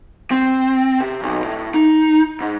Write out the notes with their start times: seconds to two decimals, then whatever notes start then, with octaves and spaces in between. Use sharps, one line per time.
0.31 C4
1.01 C3
1.23 B1
1.44 A2
1.74 D#4
2.41 G#2